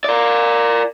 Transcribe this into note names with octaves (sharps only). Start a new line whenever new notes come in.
A#4 D5